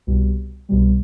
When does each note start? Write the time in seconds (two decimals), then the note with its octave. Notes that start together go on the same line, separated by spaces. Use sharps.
0.07 C2 B2 G3
0.69 C2 B2 G3